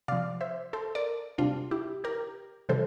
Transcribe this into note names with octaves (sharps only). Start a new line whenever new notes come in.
C3 F3 D5 F5
C5 E5
A4 C5
A#4 D5
C3 G3 D4 F4
E4 G4
G4 A#4
C3 E3 G3 A4 C5